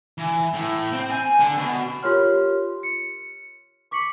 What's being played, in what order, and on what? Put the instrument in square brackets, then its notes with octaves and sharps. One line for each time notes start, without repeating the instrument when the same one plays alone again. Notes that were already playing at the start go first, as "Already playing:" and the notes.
[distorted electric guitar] E3
A2
C4
G#5
D3
B2
[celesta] F4 G4 A#4 C#5 C6 F6
C#7
C#6 D6 B6 C#7 F#7